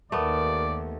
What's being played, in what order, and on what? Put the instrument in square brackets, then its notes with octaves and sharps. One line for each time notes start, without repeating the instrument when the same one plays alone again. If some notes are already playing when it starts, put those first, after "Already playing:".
[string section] D#2 [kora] A3 B3 [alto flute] A#4 [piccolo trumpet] D5